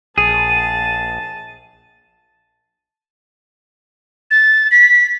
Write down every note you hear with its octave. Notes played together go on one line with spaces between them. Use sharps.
A#1 G#4 A5
A6
B6